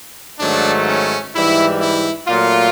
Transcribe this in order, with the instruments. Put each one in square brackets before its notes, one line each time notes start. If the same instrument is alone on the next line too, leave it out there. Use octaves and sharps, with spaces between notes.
[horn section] G#2 D#3 F#3 A3 D4
C#4
G#2 E3 G3 E4
E4
A#2 F#3 A3 F4